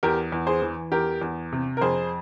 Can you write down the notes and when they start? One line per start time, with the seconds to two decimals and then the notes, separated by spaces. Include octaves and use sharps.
0.03 E2 G4 A#4
0.32 E2
0.47 G#4 C5
0.62 E3
0.92 E2 G4 A#4
1.21 E2
1.52 C3
1.77 A#4
1.81 F2 G#4 C5